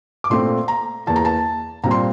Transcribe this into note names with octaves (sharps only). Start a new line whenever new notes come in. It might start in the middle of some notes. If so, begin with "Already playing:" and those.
D6
A#2 A3 C4 C6
A#5
E2 E3 A#3 A5
A#5
A5
A#2 G3 C4 A#5
C6